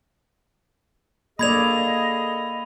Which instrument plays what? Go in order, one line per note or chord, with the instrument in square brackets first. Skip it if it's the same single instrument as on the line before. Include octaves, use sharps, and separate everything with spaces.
[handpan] A#3 D5 [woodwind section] G#4 A4 D#5 [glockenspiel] B5 G#6 F7